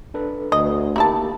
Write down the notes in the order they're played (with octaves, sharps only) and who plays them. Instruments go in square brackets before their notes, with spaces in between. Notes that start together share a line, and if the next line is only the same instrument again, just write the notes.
[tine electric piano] D4 A4 B4
[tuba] D2 [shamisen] D#5
[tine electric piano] A#3 G4 [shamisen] D#4 E4 A5